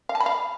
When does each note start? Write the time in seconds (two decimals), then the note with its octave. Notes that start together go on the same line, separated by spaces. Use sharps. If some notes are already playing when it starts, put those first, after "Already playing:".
0.09 F5
0.15 A5
0.20 B5
0.26 F5